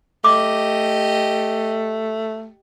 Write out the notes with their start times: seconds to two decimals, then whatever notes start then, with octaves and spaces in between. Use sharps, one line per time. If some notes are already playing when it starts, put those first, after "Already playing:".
0.24 A3 G4 D#5 D6